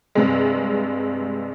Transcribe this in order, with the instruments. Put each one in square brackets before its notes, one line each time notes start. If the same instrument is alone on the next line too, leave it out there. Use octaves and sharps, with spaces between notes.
[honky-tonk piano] G2 C3 G#3